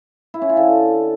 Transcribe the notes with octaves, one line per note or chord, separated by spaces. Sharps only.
E4
C#4
F4
D3